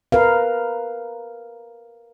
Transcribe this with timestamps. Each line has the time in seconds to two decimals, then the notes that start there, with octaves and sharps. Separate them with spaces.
0.12 A#4 B4 F5